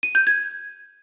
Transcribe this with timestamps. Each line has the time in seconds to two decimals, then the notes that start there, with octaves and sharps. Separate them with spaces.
0.03 D#7
0.15 G6
0.27 G#6